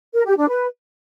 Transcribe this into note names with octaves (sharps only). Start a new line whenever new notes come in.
A#4
G4
D4
B4